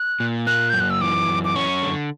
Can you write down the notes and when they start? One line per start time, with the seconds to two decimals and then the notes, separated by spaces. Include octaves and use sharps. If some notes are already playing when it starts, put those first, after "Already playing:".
Already playing: F#6
0.20 A#2
0.47 A#3 F#6
0.70 F#2 G6
0.80 F#6
0.90 E6
1.01 E3 D6
1.28 F#2
1.45 D6
1.56 C#4 C#6
1.82 D3